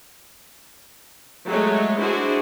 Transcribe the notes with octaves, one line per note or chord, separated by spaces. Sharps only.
F#3 G#3 A3 C#5
D4 E4 F#4 G#4 C5